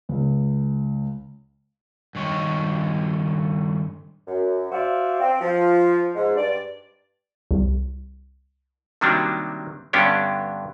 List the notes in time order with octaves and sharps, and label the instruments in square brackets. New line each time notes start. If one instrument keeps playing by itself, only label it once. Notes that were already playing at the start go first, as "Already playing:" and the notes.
[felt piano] C#2
[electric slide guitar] G2 D#3 C#5
[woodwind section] F#2
F#4 C5 D5 E5 F5
C4
F3
G#2
G2 D5
[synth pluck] C2
[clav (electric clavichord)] C3 D#3 F#3 G3 A#3 D4
G2 D3 B3 C#4 D4 G4